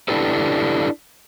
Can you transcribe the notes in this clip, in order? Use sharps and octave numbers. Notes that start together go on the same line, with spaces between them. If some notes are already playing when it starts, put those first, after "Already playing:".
D4 E4 G4 A4 B4